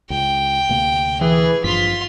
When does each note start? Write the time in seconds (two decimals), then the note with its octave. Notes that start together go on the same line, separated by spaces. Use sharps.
0.10 C#2 G5
0.69 D2 C3 A#3
1.21 E3 G#4
1.64 G#1 G2 F3 F4 C6 B6